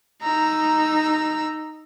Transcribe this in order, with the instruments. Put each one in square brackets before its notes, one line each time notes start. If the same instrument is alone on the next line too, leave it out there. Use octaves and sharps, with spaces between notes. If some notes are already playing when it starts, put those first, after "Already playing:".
[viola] D#4 [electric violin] A#5 E6